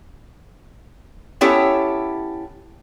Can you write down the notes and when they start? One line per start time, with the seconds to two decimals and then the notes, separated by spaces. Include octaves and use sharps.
1.41 B3 C#4 E4 G4 A4 C#5